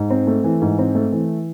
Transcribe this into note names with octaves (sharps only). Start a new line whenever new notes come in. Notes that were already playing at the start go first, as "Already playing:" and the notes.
Already playing: G#2
C4
A3
E3
G#2
C4
A3
E3